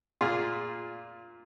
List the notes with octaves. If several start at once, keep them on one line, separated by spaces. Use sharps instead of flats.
A#2 F4 G#4